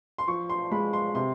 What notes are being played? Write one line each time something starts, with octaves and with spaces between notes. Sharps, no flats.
C6
F3 C#6
C6
G#3 B5
C6
C3 C6